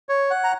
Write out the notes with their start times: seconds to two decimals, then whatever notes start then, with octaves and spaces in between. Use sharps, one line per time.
0.09 C#5
0.31 F#5
0.44 A#5